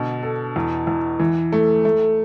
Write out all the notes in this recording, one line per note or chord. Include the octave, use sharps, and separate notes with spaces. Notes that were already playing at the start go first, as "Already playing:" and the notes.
Already playing: B2 D3
A4
E2
E2
E3
A3
A3